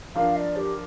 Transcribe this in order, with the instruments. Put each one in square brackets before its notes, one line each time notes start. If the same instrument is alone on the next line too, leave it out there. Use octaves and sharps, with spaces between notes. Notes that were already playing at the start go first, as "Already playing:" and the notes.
[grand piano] F3 D4 A#4 [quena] F5
[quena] D5
G4